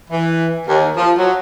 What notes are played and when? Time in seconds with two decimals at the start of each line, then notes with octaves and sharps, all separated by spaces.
0.11 E3
0.67 D#2
0.96 F3
1.17 F#3